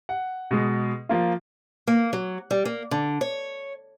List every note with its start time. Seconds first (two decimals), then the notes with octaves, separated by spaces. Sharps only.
0.09 F#5
0.51 B2 G#3
1.09 F3 A#3 F4
1.87 A#3
2.13 F#3
2.51 G3
2.65 A#3
2.91 D3
3.21 C#5